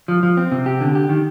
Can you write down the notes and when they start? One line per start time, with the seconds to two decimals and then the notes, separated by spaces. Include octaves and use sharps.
0.08 F3
0.23 F3
0.37 C4
0.52 C3
0.66 G4
0.81 D3
0.95 G4
1.09 D#3